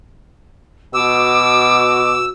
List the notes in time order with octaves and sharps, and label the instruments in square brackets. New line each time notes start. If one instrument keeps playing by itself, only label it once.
[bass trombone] B2 [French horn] F#4 [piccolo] D6 [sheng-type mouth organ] E6